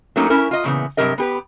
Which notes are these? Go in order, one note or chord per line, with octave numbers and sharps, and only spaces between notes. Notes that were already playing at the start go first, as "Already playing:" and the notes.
F#3 A3 A#3 C#4 D#4
C#4 E4 A#4
F4 D#5
A#2 C#3 E3 B3
G2 C3 F#3 G4 A#4 D#5
B3 G4 B4